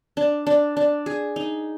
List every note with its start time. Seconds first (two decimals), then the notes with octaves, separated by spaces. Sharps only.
0.17 D4
0.47 D4
0.77 D4
1.06 G#4
1.36 D#4